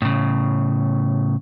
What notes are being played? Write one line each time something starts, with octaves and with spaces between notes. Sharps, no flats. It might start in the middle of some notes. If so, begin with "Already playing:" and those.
A2 C#3